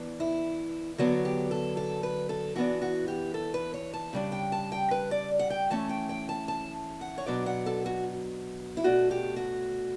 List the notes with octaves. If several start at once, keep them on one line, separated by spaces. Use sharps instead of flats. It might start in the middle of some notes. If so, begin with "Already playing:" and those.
Already playing: E3 B3 D4
E4
D3 F#3 B3 D4 F#4
G4
A4
A4
B4
A4
E3 B3 D4 F#4
F#4
G4
A4
B4
C#5
A5
C#3 G3 D4
G5
A5
G5
B4
D5
F#5
G5
E3 A3 C#4 A5
G5
G5
A5
A5
F#5
C#5
B2 F#3 B3 D4 D5
F#5
A4
F#4
E4
B2 A3 D4 F#4
G4
F#4